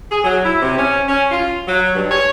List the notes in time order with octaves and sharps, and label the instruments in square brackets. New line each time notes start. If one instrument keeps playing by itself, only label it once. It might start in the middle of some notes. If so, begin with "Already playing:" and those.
[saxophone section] G#4
F#3
E4
C3
C#4
C#4
F4
F#3
G2
C#5